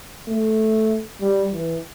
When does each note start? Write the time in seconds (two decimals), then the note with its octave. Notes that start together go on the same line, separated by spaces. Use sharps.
0.27 A3
1.21 G3
1.52 E3